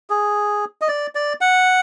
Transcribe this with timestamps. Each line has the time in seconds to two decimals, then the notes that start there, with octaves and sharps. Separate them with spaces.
0.10 G#4
0.81 D#5
0.88 D5
1.15 D5
1.41 F#5